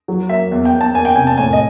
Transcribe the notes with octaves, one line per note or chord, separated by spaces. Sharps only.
F#3
A#3 E5
E2
G5
E2
A5
A#3 G#5
G5
C3 G#5
A5
A2 G#5
D#5